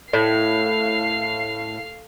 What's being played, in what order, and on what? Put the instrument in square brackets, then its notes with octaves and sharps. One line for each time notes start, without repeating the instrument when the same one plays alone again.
[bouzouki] A2 [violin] F5 C7